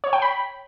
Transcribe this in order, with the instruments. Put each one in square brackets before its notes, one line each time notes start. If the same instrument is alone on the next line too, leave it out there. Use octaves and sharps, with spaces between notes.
[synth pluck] C#5
G5
B5